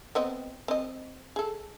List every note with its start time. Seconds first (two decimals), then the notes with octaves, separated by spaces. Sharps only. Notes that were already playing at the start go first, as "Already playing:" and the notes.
0.15 B3 C4 D#5
0.68 C4 D#5
1.36 G#4 A4